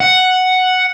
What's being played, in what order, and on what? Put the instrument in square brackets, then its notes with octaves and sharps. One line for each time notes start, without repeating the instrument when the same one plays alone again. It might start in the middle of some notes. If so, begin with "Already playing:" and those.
[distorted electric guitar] F#5